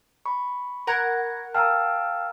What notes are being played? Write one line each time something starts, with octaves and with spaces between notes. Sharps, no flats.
B5 C#6
A#4 F#5 G#6 A#6
F5 G5 A5 A#5 E6 F6